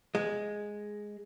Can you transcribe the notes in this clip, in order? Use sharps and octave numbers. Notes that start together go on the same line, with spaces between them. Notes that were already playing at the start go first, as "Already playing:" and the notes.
G#3